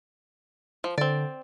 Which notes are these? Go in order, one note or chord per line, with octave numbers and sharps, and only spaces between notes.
F3
D3 C4 D5